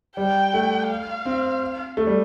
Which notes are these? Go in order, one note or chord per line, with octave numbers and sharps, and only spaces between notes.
G3 G5
A3
F5
C4
A3
G3